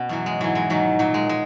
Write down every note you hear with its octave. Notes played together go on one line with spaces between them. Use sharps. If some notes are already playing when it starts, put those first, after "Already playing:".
Already playing: B2 B3 C#4
F#2 E3 F#3
G#3
G#2 E3 F#3
G#3
G#2 D#3 F#3
A#2 F#3
G#3
G#3